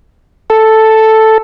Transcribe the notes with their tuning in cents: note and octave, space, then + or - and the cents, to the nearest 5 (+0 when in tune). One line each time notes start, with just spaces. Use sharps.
A4 +0